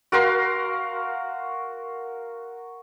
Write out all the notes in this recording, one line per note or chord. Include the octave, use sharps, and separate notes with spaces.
F#4 A#4 F5 C6